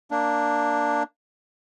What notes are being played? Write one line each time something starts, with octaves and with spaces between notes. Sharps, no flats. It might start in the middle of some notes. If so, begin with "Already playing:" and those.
A#3 D4